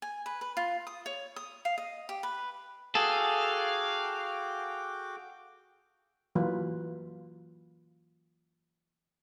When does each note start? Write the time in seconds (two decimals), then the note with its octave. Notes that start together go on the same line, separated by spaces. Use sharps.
0.02 G#5
0.26 B4
0.41 B4
0.57 F4
0.87 D#6
1.06 C#5
1.36 D#6
1.65 F5
1.78 D#5
2.09 G4
2.23 B4
2.95 F#4 G#4 A4 F5 G5 D6
6.35 E3 F#3 A#3 F4 B4